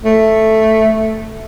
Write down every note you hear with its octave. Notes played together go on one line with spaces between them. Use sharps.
A3